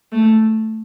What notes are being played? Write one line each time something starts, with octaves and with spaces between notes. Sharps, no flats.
A3